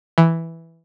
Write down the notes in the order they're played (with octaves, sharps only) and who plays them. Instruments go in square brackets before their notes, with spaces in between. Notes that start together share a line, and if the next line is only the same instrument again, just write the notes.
[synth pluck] E3